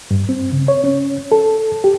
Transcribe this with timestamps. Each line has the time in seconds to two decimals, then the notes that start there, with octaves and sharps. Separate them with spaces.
0.11 G2
0.29 C4
0.53 C#3
0.68 C#5
0.84 C#4
1.32 A4
1.84 G4